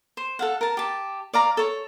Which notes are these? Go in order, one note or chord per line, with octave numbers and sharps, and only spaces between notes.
C5
A4 F5 F#5
A#4 A5
G4 A5
D5 F5 A#5
A4 C#5